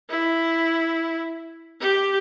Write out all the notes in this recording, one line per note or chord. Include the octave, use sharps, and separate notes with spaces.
E4
G4